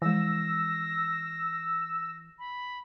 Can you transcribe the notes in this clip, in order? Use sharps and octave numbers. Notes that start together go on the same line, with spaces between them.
E3 F3 G#3 E6 A#6
B5